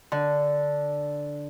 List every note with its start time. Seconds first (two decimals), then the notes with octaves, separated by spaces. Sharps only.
0.12 D3